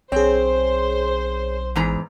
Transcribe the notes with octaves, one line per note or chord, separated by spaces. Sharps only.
B1 C4 G#4 C5 C#5
A1 E2 G#2 A#5